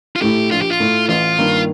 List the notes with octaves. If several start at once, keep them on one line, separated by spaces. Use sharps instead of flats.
F4
A2 A3 G4
A#1 F4
G4
F4
A2 A3
A1 F4
G2 D#3 A#3